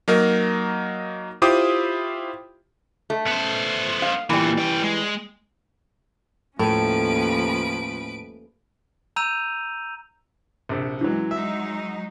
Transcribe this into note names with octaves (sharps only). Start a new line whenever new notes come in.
F#3 A#3 D#4 A#4
E4 F4 G4 C5 D6 D#6
A3
B3 C5
F5
E2 A#2 E3 G3
C#4 G5
G#3
D#2 A2 F3 A3 C#4 B4 D7
A#5 E6 G6 D#7 F7
A#1 C3
F#2 E3 F#3 G#3
F#3 G#3 D#4 E5